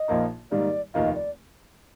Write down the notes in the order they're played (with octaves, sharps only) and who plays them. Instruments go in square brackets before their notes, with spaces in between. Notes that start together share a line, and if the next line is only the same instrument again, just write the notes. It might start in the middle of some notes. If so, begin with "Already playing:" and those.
Already playing: [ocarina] D#5
[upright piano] A#1 A#2 F3 A#3 D#4
[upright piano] G#2 D#3 G3 A#3 [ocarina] D5
[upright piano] F1 D#2 D#3 A#3 F4 [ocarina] D#5
[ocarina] D5